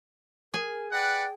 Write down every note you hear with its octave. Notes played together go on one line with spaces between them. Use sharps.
G#4 A#4 G#5
B4 D5 F#5 G5